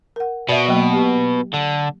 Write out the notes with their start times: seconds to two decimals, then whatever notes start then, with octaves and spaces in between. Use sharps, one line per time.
0.16 A#4 F#5
0.49 B2 D5 E5
0.68 F#3 A#3
0.93 G4
1.54 D3